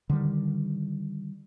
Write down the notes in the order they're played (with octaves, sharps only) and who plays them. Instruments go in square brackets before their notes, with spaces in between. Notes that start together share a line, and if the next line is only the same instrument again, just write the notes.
[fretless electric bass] D3 D#3 G3